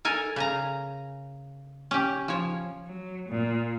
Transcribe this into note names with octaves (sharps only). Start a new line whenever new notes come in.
A4 A#4 G#5
C#3 G#5 A#5
C#4 G4
F3 C#5
F#3
A#2